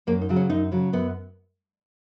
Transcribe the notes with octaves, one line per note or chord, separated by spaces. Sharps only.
F#2 A#3
D#4
C#3 F#3
C#4
F#2 D#4
C#3 F#3
F#2 B3